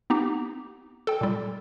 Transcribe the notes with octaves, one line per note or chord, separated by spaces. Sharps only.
B3 C4 D#4 G4
A4 G5
A#2 G3